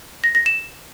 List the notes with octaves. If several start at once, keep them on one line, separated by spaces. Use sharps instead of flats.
A#6
A#6
E7